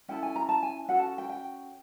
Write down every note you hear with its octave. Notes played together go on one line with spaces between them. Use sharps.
C#4 E4 A4 G5
G#5
A#5
A5
G#5
C#4 F#4 A4 F#5
A5
G5
G5